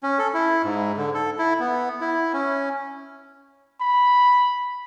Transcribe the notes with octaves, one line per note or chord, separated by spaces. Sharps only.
C#4
A4
E4
G#2
D3
A4
E4
B3
E4
C#4
B5